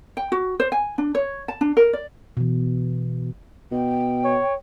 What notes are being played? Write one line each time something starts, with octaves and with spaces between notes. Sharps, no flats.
G5
F#4
C5
G#5
D4
C#5
A5
D4
A#4
D5
B2 E3
B2 G5
C#5